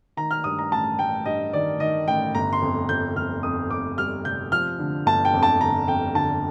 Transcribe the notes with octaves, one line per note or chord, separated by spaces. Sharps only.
D#3 A#5
F6
G2 D#6
A#5
A1 A5
A1 G5
G2 D#5
D#3 D5
D#3 D#5
A1 G5
G1 A#5
C6
F2
F2 G6
F2 F6
F2 D#6
F2 D6
G3 F6
C3 G6
F3 F6
D3
G1 A5
G5
F2
A5
D3 A#5
F2 G5
D3 A5